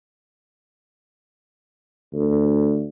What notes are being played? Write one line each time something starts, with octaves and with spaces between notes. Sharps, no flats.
D2